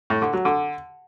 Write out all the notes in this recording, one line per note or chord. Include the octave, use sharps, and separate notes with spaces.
A2
D3
F#3
D3